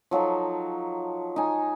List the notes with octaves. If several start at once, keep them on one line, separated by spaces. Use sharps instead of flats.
F3 F#3 D#4 A4
D#4 G#5